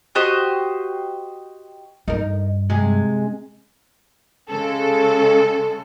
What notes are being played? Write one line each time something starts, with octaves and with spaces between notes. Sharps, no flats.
F#4 G4 C5 D#5
G2 D#4 A#4
C3 G#3
C#3 G#3 A4